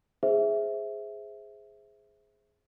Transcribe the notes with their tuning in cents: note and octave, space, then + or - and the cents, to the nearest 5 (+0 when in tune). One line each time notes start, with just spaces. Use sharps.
G#4 +0 C5 -5 E5 +0